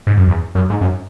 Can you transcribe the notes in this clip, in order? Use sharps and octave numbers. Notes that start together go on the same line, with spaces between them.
G#2
F#2
E2
F#2
G#2
F#2